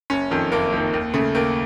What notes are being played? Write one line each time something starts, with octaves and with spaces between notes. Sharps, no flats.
F#1 C#4
F2 D#3
F#1 A#3
F2 D#3
D#2
C#3 A3
D#2 A#3